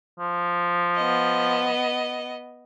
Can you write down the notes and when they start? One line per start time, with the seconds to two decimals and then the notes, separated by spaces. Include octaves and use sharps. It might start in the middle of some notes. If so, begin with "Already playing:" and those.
0.19 F3
0.96 B3 D#5